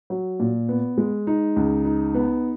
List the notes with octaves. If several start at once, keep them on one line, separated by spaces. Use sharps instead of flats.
F#3
A#2
B3
G#3
D#4
C#2
D#4
B3